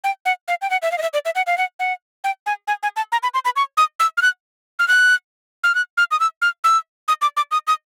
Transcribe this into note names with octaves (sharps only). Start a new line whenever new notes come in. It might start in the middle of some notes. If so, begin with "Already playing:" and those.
G5
F#5
F5
G5
F#5
E5
F5
D#5
E5
D5
E5
F#5
F5
F#5
F#5
G5
G#5
G#5
G#5
A5
A#5
B5
C6
B5
C#6
D#6
E6
F6
F#6
F6
F#6
F6
F#6
F6
D#6
E6
F6
E6
D#6
D6
D6
D#6
D#6